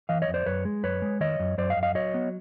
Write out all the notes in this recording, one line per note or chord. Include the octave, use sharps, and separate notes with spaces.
E3 D#5 F5
C#5 D#5
F2
C5 D5
F#2 B4 C#5
G#3
F#2 B4 C#5
G#3
D#3 C#5 D#5
F#2
F#2 C5 D5
D#5 F5
F#2
D#5 F5
F#3 C#5 D#5
B3